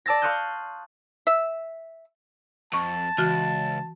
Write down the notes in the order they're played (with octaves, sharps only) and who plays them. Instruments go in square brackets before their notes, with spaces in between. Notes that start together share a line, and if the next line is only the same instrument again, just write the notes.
[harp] D5 A5 E6 A6 A#6
F5 C6 C#6 D#6 F#6 G6
[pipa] E5
[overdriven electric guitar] F2 [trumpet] A5 [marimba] C#6
[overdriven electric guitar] C#2 [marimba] E3 F#4 F6